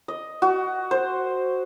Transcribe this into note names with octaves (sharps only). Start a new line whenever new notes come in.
D#5
F#4
C5